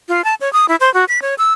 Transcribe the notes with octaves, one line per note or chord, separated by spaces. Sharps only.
F4
A5
C#5
D#6
E4
C5
F#4
B6
C#5
E6